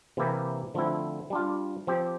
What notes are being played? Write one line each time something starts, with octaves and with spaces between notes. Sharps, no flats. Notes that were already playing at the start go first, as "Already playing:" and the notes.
C3 E3 A#3 E4 G4
D3 F3 A3 C4 E4
G3 D4 F4
F3 C4 G4